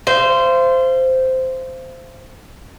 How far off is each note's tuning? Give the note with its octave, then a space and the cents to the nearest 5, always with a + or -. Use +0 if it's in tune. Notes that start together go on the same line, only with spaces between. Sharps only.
C5 -10 F5 -40